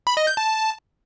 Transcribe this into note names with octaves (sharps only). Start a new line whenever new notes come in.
B5
D#5
G6
A5